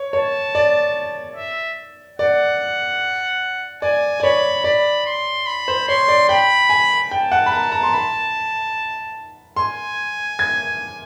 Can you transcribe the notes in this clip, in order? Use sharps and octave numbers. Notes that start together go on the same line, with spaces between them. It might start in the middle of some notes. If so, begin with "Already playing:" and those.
Already playing: C#5
C#5 A5
D5
E5
D5 F#5
D5 G#5
D5
C#5 B5
D5 B5
C6
B5
C5
C#5 C6
D5
G5 B5
G#5
G5 A5
F#5
B5
A#5
A#5
C6
B5
G#5 C6
G#6